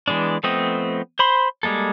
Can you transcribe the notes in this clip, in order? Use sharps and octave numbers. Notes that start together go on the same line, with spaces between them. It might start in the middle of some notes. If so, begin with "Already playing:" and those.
E3 G#3 B3 D4
F3 A3 B3 C4 D#5
C5 B5 C6
G3 G#3 A#3 A4